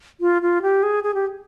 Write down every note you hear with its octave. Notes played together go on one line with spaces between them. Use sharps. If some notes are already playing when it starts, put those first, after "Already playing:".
F4
F4
G4
G#4
G#4
G4